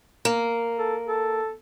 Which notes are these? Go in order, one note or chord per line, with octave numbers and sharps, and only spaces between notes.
A#3
A4
A4